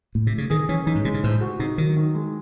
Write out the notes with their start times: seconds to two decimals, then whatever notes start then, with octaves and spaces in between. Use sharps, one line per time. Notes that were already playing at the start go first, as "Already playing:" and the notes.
0.15 A2
0.27 C3
0.38 C#3
0.50 D#3 G#4
0.69 E3 C#4
0.86 E3 D#4
0.95 G#2
1.05 C3 G#3
1.14 C#3
1.23 A2 C5
1.41 F#4
1.59 C3 D#4
1.78 D#3 F#3
1.97 D#3
2.15 G#3